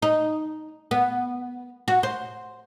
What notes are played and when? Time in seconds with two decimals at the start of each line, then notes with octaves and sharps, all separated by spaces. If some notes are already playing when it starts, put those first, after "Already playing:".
0.02 D#4
0.91 B3
1.88 F#4
2.03 C5